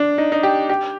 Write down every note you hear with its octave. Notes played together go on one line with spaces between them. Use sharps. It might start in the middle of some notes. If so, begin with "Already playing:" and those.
Already playing: D4
D#4
D#4
G4
G4